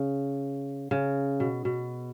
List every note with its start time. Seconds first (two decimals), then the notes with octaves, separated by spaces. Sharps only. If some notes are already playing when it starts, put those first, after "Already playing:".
Already playing: C#3
0.91 C#3
1.40 B2
1.65 B2